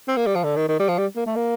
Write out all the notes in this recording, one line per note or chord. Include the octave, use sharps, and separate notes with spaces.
C4
A#3
G3
F3
D3
D#3
D#3
G3
F3
G3
A#3
A3
A#3